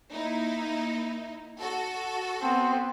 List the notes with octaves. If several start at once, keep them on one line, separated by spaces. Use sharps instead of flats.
A#3 D#4 E4
F#4 A4
B3 C4